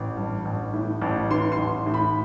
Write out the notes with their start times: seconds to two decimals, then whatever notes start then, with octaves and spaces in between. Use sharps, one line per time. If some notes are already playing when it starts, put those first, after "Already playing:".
Already playing: A1
0.17 G2
0.45 A1
0.73 A2
1.02 A1
1.31 E3 C6
1.52 C6
1.58 A1
1.86 A2
1.94 B5